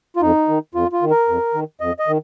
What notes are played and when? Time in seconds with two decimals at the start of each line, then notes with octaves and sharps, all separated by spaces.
0.16 F4
0.22 F2 D#4
0.48 D#3
0.74 F2 F4
0.93 F4
1.02 D#3
1.10 A#4
1.28 F2
1.54 D#3
1.80 F2 D#5
1.99 D#5
2.08 D#3